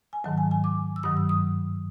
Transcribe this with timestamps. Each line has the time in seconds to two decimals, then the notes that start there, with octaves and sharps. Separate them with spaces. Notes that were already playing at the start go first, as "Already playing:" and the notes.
0.13 G#5
0.24 G#2 D#3 F#3 A5
0.38 G#5
0.51 G#5
0.64 D6
0.96 E6
1.03 G2 D#3 F#3 D#6
1.17 E6
1.29 D#6